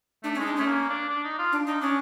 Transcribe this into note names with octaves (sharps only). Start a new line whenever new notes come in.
A3 D4
C#4
G#3 D#4
D4
A3 C#4
A#3
D4
D4
D#4
F4
D4
D4 D#4
C#4 D4